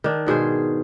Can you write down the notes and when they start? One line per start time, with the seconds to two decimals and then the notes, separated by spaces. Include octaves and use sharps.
0.04 D#3 D4
0.27 G#2 B2 G#4 C5